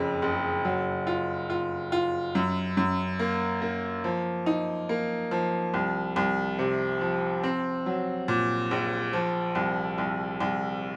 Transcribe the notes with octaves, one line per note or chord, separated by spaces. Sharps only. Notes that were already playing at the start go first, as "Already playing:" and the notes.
Already playing: F#1 F2 C#3
F#1
F#3
F4
F4
F4
F#2
F#2
A#3
A#3
F3
D#4
A#3
F3
C2
C2
C3
F3
C4
F#3
A#2
A#1
F3
C2
C2
C2